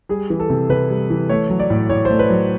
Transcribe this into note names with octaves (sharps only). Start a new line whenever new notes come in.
G3 G#4
E3
A4
C3
C3 B4
G3
E3
A3 C#5
F#3
D5
A2
A2 C#5
C5
A3
B4
F#3